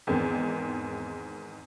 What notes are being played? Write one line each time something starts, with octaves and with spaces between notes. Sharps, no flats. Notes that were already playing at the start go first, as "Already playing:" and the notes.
E2 G#2 D#3 C4